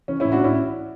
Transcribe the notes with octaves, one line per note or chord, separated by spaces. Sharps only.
E3 C#4
A2 C#4 E4
D4 F#4
A2 C#4 E4